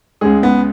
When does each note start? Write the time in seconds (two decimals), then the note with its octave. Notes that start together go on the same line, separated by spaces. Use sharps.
0.21 C#2 C#3 G#3 G#4
0.43 B3